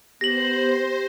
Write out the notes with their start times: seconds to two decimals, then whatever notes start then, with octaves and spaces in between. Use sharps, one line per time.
0.21 B3 G4 C5 A#6 F#7